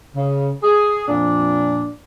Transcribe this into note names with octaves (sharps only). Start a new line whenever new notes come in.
C#3
G#4
F2 A#2 D4